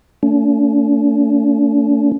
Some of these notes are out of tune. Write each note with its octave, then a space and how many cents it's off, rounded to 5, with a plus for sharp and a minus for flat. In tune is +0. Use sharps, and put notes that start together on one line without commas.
A3 +35 D4 -45